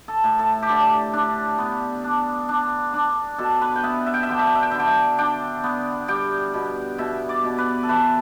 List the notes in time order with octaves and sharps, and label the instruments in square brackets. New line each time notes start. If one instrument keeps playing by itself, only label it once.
[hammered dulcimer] A4
A2
A4
G4
D3 A4
D4
B3
D4
D4
D4
B2 A4
B4
G5
B3 E5
E5
G5
E5
D3 G5
E5
G5
E5
G5
D3 E5
G5
E5
D4 G5
B3
G3 G5
B2
B2 E5
D5
B2
B4
A4
E3 B4